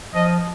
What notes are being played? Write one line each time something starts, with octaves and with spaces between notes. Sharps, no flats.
F3 D#5